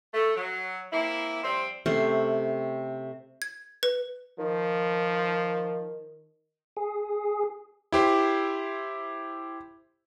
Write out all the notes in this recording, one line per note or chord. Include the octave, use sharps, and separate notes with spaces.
A3
F#3
A#3 C4 E4
F3 G3 C4
C3 A3 C#4 C6
G#6
B4
D#3 F3
G#4
E4 G4 C5